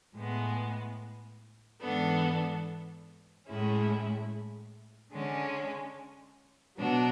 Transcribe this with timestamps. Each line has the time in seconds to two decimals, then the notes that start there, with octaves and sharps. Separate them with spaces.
0.16 A2 G#3 B3
1.82 G#2 E3 B3 D4 A4
3.47 A2 G#3 C#4 E4
5.12 D3 G#3 C#4
6.77 B2 F#3 B3 D4